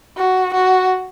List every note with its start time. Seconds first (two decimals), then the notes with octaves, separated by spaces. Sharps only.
0.18 F#4
0.54 F#4